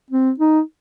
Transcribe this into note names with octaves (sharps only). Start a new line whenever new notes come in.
C4
D#4